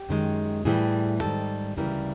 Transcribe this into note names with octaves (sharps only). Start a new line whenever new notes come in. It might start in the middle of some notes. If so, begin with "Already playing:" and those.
Already playing: G4
F#2 D#3 G#3
A2 E3 G3 G#4
G#2 D#3 G3 A4
D2 C#3 E3 G3 A#4